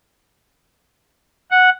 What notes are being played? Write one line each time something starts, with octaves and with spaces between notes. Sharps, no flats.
F#5